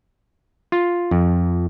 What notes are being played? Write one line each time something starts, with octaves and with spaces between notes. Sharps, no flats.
F4
F2